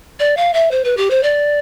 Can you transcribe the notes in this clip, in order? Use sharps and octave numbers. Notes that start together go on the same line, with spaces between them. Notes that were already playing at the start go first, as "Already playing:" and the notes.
D5
F5
E5
C5
B4
G4
C5
D5